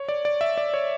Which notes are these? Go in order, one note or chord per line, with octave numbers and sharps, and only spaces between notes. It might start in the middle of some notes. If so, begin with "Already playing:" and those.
Already playing: C#5
D5
D5
E5
D5
C#5